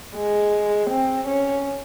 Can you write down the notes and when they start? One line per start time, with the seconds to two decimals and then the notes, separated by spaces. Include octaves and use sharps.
0.16 G#3
0.90 C4
1.27 C#4